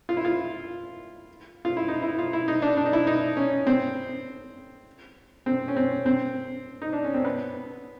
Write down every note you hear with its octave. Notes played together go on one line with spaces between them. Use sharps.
F4
E4
F4
F4
E4
D#4
E4
F4
E4
D#4
D4
D4
D#4
E4
D#4
C#4
C4
C4
C#4
C4
C4
D#4
D4
C#4
C4
B3